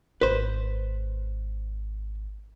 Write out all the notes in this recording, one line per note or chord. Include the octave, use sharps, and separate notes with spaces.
G#1 B4 C5